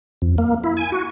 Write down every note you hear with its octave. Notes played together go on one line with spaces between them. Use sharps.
F2
A#3
E4
G#5
F#4